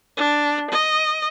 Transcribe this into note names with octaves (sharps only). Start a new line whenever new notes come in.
D4
D#5